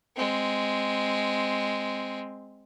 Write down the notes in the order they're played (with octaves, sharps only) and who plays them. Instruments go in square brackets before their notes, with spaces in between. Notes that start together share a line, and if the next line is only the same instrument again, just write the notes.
[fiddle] G#3 C4